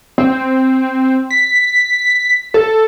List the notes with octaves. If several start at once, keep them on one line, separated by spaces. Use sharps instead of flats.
C4
B6
A4